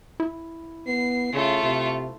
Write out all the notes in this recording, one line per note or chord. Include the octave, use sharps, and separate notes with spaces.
E4
B3 C7
C#3 A3 F4
C3